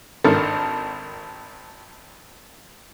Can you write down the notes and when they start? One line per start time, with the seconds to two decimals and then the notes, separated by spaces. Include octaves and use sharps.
0.24 G#1 D#3 D4 A4 A#4